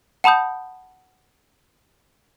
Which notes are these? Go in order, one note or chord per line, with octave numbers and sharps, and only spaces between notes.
F#5 A5 B5 D#6 G6